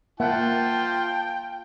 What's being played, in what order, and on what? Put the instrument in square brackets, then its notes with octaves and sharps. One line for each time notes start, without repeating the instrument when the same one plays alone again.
[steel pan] A#3 E5 F#5 [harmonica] F4 A5 [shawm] G5